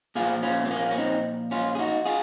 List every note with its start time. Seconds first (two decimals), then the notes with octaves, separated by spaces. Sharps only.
0.15 A#2 F3 F4 G#4
0.43 C#4 F4
0.64 C4
0.70 A#3 C#4
0.91 C#4
0.97 C4 D#4
1.51 C#4 F4
1.75 G#4
1.79 D#4 F#4
2.05 F4 G#4